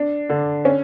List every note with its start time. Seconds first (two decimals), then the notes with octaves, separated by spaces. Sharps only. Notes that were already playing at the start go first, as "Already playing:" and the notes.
Already playing: D4
0.29 D3
0.65 C#4